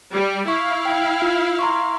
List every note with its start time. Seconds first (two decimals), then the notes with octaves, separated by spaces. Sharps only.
0.13 G3
0.48 E4 F5 C#6
0.85 G5
1.22 F4
1.59 A#5 C6 C#6